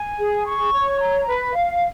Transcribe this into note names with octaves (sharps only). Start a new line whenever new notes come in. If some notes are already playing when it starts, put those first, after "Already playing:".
Already playing: G#5
G#4
C#6
C#5
A#5
B4
F5